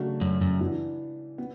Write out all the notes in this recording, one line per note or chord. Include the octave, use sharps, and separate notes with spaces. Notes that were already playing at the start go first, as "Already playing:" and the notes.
Already playing: C#3 F#3 A3 D4 F#4
F#2
F#2
E3 B3 D4
B3